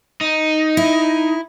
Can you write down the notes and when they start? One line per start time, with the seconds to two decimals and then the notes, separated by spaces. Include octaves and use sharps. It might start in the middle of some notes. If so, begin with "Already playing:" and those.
0.21 D#4
0.77 E4